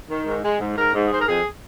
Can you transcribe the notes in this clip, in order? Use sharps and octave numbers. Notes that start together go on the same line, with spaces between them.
D#3
G#2
G#3
G#2
G#2 A#4
G#2
G#4
G#2 C5
A#4
F2 G#4